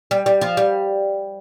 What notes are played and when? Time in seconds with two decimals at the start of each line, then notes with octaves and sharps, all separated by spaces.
0.11 G3
0.26 G3
0.41 F3
0.57 G3